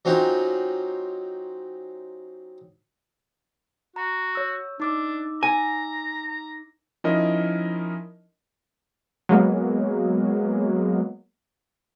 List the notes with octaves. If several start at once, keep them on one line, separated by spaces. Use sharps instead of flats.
F#3 C4 C#4 D#4 F4 G4
F#4 A#5
C#5 E6
D4 D#4 D6 E6
G#5 A#5
A#5
F3 C#4 D#4 E4 A#4 D#5
F#3 G#3 A#3 B3